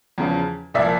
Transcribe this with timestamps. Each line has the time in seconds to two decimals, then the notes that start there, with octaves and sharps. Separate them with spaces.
0.18 E2 C#3 F3
0.74 C2 A#2 F3 D5 E5